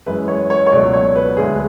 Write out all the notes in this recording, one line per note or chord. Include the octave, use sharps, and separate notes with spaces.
F#2 E3 G#3 B4
C#5
C#5
C#5
C#2 B2 F#3 A3 D5
C#5
B4
D2 D3 G#3 G#4